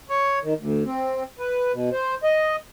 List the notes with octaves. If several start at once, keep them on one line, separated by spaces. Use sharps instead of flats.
C#5
D#3
D2
C4
B4
B2
C5
D#5